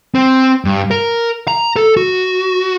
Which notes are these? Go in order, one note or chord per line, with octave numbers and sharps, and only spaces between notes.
C4
G2
A#4
A#5
A4
F#4